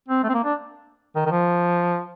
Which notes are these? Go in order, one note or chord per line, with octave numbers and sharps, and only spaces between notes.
C4
A3
C4
A#3
D4
D#3
D#3
F3